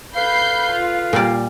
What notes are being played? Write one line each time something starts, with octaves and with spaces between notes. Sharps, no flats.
A4 B4 F5 B5 G6 C7
F4
A#2 G3 D5